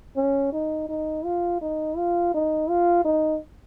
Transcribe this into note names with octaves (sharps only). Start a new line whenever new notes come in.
C#4
D#4
D#4
F4
D#4
F4
D#4
F4
D#4